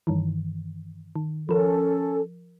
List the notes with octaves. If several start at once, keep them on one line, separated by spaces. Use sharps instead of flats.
G2 D#3 E3
D#3
F3 C#4 A4 A#4